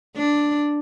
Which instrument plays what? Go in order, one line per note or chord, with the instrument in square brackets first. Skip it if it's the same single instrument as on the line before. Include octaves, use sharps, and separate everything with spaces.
[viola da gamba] D4